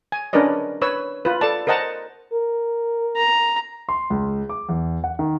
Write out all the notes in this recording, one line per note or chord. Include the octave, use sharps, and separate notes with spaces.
G#5
C#4 D4 A#4 B4 D5 D#5
B4 C#5 E6
F4 B4
A4 D5 A5
A#4 C5 D#5 F#5 A5 A#5
A#4
A#5
C6
C#2
D6
E2
F#5
D#3